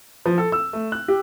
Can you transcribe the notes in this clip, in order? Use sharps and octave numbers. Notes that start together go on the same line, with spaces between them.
F3
A4
E6
A3
F#6
G4